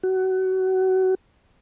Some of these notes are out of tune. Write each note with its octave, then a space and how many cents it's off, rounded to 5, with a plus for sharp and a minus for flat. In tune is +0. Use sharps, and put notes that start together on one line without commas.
F#4 +25